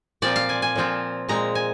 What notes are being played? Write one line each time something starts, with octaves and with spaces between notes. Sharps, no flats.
A#2 F3 C4 F4 D5
F5
G#5
G#5
A#2 F3 C4 F4
A#2 G#3 C4 A#5
G#5